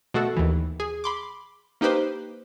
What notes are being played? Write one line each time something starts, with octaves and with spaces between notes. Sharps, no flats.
B2 A3 F#4 A4
D#2 E3
G#4
B5 C6 D6
A#3 D#4 G4 B4 C5